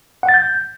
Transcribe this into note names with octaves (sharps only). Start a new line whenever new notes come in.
F#5
A6
G6